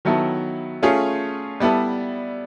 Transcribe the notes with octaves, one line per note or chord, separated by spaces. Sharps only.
D#3 F#3 B3 E4 A4
A3 C#4 F4 G#4
G3 B3 E4 A4